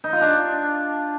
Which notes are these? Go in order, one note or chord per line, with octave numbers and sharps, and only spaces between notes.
D#4
F4
D4